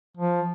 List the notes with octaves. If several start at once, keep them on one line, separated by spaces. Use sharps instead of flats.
F3